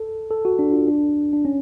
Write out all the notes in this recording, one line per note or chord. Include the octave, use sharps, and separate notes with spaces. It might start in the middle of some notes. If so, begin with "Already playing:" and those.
Already playing: A4
A4
F#4
D4
F4
D4
D4
C#4